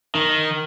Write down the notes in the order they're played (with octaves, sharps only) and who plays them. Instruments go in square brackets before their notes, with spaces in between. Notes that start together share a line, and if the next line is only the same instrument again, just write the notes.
[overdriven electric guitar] D#3